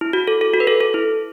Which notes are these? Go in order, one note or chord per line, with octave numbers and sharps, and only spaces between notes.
E4
F#4
A4
A4
F#4
B4
A4
A4
E4